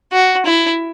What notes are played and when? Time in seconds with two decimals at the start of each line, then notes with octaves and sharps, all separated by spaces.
0.12 F#4
0.46 E4